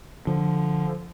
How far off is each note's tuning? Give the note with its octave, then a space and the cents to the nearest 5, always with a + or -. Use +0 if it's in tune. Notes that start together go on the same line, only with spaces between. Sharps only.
D3 +0 F3 +0